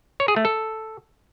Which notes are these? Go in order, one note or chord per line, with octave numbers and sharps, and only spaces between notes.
C#5
G#4
A3
A4